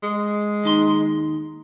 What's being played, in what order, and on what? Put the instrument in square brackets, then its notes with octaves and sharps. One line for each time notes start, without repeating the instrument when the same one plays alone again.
[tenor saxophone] G#3
[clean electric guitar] D#2 D#4 C6